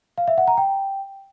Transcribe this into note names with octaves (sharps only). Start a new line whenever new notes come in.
F5
E5
F#5
A#5
G5